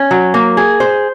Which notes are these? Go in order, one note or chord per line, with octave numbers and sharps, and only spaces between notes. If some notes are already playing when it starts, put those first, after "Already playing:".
Already playing: C#4
F#3
A#3
G#4
C5